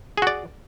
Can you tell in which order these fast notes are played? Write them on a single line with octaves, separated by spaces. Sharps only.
G#4 F#4 D5